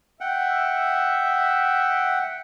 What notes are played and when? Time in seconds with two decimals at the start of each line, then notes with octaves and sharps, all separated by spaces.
0.21 E5 F#5 G5